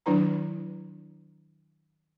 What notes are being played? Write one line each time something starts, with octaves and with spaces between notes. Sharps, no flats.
D#3 F#3 D4 E4 B4 A#5